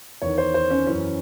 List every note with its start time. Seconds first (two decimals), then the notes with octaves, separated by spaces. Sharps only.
0.22 E2 D#3 C#5
0.38 C5
0.54 C5
0.70 C#4
0.86 F#2 E3 C#4